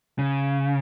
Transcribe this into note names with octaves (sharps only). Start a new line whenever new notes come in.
C#3